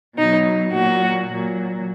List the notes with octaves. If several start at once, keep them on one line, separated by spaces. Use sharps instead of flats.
B2 F#3 D#4
A#2 F#3 F#4
A#2 F#3